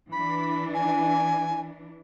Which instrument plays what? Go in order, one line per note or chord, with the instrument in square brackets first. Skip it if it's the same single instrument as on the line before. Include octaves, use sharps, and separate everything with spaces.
[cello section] E3 D4 [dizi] B5
[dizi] G#5